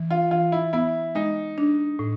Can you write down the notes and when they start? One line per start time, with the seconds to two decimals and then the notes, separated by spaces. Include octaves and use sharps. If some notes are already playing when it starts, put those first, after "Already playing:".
Already playing: E3
0.11 F4
0.31 E3 F4
0.52 E4
0.73 B3 E4
1.15 G#3 D#4
1.58 D4
1.99 A2